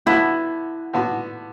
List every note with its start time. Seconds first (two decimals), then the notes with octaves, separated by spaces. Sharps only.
0.06 D3 B3 E4 F#4
0.93 D3 B3 F#4